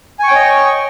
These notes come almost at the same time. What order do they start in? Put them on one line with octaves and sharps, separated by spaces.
G#5 C#6 G5 C#5 D#5